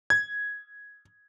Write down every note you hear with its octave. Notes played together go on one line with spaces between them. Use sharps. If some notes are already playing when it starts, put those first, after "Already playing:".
G#6